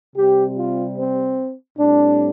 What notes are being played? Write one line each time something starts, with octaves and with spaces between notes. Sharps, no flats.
C3 G3 C4 G4
F4
C4
A2 G3 C4 D4